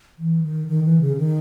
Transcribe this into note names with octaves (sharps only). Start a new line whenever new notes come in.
E3
D#3
D#3
E3
C#3
D#3